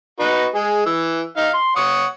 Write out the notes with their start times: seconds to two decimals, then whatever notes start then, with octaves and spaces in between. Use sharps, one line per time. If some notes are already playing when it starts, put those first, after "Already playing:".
0.20 D#4 F#4 B4
0.55 G#3 G#4
0.86 E3 E6
1.37 D#4 F5
1.54 C6
1.76 C#5 F#5 D#6